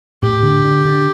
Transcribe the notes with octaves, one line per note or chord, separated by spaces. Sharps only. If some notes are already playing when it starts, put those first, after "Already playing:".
A2 G4
D3
D3
D3